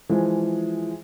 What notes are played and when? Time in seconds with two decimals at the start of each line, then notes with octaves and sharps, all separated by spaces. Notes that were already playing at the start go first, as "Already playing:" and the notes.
0.09 E3 F3 G#3